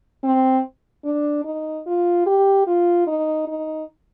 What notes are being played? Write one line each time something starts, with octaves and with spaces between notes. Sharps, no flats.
C4
D4
D#4
F4
G4
F4
D#4
D#4